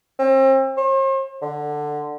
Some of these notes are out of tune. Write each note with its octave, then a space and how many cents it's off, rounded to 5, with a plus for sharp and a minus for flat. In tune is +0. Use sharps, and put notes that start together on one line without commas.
C4 +35
C5 +45
D3 +15